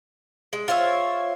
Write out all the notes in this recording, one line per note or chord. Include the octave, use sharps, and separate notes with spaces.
G#3
F4 C5 C#5 E5